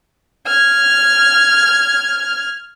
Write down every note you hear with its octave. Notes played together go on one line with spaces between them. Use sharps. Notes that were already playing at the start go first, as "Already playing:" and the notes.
F6 G#6